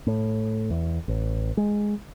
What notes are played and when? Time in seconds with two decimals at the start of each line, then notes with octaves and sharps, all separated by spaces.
0.07 A2
0.71 E2
1.08 A1
1.57 G#3